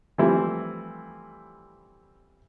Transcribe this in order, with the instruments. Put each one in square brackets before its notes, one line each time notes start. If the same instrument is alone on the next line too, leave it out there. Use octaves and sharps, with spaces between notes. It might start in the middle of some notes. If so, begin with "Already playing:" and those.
[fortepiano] E3 F3 G3 A3 C4 E4